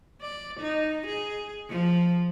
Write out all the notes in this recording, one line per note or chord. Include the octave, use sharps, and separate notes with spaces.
D5
D#4
G#4
F3